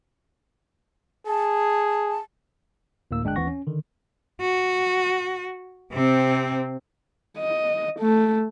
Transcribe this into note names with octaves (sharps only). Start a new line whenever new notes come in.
G#4 A5
D2 A2 A#3 E6
G1 G#3 D4 G5 F#6
D#2 E3 C4 F#5 C#6 A#6
C#4
D3 D#3
F#4
C3 C4
D#5
A3